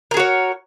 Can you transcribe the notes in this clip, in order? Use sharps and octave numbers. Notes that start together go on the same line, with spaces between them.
F#4 G#4 A#4 C#5